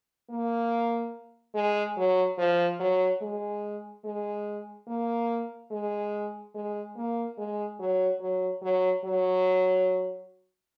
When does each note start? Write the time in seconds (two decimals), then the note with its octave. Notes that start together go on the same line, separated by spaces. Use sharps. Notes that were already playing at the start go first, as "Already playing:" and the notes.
0.30 A#3
1.55 G#3
1.97 F#3
2.38 F3
2.80 F#3
3.22 G#3
4.04 G#3
4.88 A#3
5.71 G#3
6.54 G#3
6.96 A#3
7.38 G#3
7.79 F#3
8.20 F#3
8.62 F#3
9.04 F#3